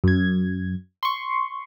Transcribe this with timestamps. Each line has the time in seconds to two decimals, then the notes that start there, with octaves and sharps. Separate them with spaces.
0.04 F#2 G#6
1.03 C6 C#6